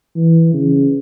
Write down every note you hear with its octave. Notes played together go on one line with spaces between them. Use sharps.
E3
C#3